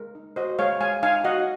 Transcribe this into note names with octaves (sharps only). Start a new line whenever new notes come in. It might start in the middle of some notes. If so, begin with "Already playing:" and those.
Already playing: G#3 A#4
D#4
F#4 C5 D#5
G#3 C#5 F5
G#3 F5 G#5
D#4 F5 G#5
F#4 D#5 F#5